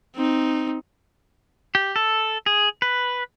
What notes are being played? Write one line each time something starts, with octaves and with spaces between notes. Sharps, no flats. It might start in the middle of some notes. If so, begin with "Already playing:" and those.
C4 D#4
G4
A4
G#4
B4